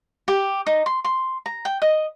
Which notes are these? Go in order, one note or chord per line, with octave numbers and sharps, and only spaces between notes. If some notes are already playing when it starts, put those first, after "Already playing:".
G4
D#4
C6
C6
A#5
G5
D#5